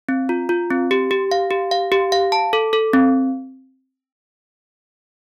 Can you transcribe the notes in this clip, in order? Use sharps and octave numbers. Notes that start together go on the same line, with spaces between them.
C4
F4
F4
C4
G4
G4
F5
G4
F5
G4
F5
A5
A4
A4
C4